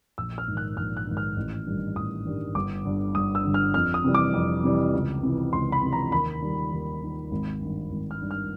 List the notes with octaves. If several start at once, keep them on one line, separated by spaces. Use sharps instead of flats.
A#1 E6
F6
G#2 D#3
F#6
A#1 F6
F#6
G#2 D#3
F6
A1
G2 D#3 G3
A1 D#6
G2 D#3 G3
G1 D6
G2 D3
G1 D#6
E6
G2 D3
F6
F2 F6
D#6
C3 E3 G3
D6
F2
C3 E3 G3
C#2
C3 E3
C#2 C6
B5
C3 E3
A#5
D#2 B5
D#3 G3
D#2
D#3 G3
G#1
G2 D#3
G#1
F6
G2 D#3
F6